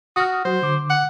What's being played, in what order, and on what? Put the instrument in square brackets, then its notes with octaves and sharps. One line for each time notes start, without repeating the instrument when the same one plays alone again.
[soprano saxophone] F#4 [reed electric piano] D#6 F6
[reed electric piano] F#3 F#4 [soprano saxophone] C5
[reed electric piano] D3 D6
[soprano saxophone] F#5